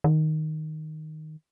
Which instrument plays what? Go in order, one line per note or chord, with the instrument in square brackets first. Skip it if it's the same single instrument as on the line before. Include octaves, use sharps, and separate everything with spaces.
[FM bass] D#3